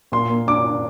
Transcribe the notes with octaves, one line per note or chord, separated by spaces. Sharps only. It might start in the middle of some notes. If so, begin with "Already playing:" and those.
A#2 C6
A#3
D4 D6
D4